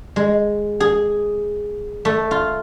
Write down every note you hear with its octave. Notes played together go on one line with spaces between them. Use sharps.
G#3
G#4
A3
F4